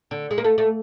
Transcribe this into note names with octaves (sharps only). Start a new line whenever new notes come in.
D3
G#3
A#3
A3
A3